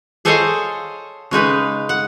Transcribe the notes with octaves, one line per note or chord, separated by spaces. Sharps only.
G#4 A4 C5 C#5 D#5 F5
C#3 G#3 D#4 B4
F#5